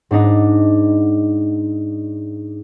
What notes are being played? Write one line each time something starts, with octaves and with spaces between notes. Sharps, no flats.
G#2 D4 D#4